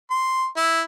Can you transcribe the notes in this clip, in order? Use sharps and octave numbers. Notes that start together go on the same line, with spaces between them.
C6
E4